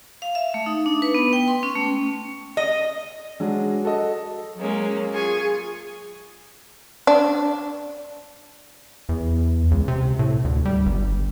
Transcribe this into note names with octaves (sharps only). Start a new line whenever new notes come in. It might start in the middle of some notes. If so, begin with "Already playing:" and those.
F5
E5
A3
D#4
D4
B4
B3
G5
C6
C#4
A3
D#5
F#3 G#3 D4
F#4 A4 D#5
F#3 G#3 A#3 C#4
F4 G#4 G#5 C#6
D4
E2
C#2
C3
A2
D2
G3
G1